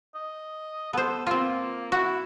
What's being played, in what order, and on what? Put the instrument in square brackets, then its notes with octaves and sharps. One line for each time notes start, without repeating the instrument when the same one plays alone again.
[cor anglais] D#5
[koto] B3 C5 [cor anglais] A4
[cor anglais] A#3 [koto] C4 F4
[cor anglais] E4 [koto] F#4